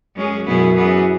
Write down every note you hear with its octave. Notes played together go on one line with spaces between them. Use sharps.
F#2 G#3 C#4 G#4
F#2 B2 B3 E4 G#4
E3 B3 G#4